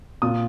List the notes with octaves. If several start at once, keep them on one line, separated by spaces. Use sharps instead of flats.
A#2 D#6